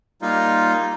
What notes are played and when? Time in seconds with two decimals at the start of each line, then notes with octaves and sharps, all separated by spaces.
0.22 G3 A#3 D#4 F4